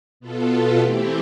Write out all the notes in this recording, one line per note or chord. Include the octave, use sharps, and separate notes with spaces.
B2 B3 F4 A4
E3 A3 C4 E4 G4